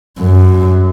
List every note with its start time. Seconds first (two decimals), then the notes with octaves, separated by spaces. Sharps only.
0.19 F#2